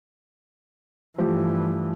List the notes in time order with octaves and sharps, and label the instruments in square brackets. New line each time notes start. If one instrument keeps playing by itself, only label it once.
[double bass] G2 E3 [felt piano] F3 A3 G4